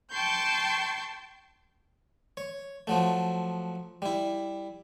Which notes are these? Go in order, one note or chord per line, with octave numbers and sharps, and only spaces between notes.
G5 A5 C6 C#6 G6
C#5
F3 F#3 A3
G3 E4